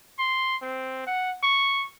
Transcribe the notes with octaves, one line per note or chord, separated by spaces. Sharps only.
C6
C4
F#5
C#6